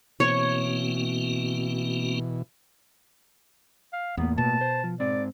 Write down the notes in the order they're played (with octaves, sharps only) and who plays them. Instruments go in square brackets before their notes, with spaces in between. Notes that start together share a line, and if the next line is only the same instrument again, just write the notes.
[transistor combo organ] B2 E3 [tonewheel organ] A#3 C4 F#4 [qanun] C#5
[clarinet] F5
[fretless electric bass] E2 [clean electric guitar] A2 A#3 [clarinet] B3
[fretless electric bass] B2 [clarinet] A5
[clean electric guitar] C5
F3
[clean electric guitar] G#2 C4 [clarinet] D5